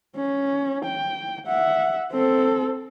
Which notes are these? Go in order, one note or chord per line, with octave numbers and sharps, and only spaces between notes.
C#4
G5
E5 F#5
C4 A4